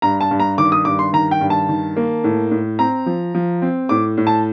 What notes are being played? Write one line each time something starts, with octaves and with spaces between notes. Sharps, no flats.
G2 A#5
A5
G2
A#5
D#3 D6
D#6
G2 D6
C6
D#3 A#5
G5
G2
A5
D#3
A#3
A2
A2
C4 A#5
F3
F3
C4
A2 D6
A2
A5